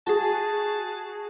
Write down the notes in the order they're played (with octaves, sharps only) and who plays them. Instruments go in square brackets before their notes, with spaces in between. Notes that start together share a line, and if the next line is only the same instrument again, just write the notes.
[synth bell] F#4 G#4 [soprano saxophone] A5